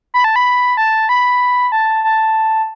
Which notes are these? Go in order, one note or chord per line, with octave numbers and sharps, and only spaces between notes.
B5
A5
B5
A5
B5
A5
A5